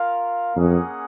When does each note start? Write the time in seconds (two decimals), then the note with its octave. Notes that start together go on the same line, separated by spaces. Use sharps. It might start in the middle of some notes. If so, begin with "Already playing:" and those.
Already playing: F4 A#4 F5
0.56 F2 A#3 C#4 G#4 D#5 F#5